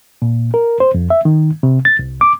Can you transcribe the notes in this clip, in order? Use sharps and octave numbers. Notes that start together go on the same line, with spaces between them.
A#2
A#4
C5
F2
E5
D#3
C3
A6
C2
D6